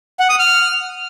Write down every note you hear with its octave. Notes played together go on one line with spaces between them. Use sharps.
F#5
D#6
F6